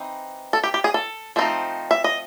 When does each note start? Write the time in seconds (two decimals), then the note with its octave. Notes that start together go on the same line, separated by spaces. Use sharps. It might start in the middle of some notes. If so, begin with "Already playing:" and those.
Already playing: E3 C4 D#4
0.53 A4
0.64 G4
0.74 G4
0.84 G#4
0.94 A4
1.36 F3 A3 C4 D#4
1.91 E5
2.04 D#5